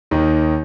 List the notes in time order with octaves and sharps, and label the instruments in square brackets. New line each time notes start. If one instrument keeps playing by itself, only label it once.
[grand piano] D#2 D#3